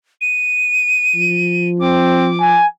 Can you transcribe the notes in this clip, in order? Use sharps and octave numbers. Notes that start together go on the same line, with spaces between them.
D#7
F3
C4 D6
G#5